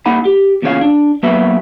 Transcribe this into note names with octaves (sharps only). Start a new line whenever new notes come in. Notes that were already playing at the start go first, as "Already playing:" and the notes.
A#3 D#4 F#5 B5
G4
E2 A#2 C#3 D4 C#5 F5
D4
F#3 A#3 B3 F#4 B4 E5